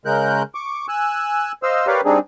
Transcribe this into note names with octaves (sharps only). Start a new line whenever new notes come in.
C#3 G#3 A#4 F#6 G6
C#6 D6
G#5 E6 F#6
C5 D#5 F5 E6
G4 A#4 B4 C#5 D5 F5
G3 C4 D4 D#4 G#4